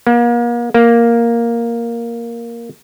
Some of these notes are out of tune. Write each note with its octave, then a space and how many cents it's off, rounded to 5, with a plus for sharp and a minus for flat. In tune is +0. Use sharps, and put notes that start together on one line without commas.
A#3 +40
A#3 +5